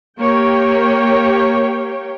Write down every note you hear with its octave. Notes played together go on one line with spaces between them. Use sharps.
A#3 G4 C#5 G5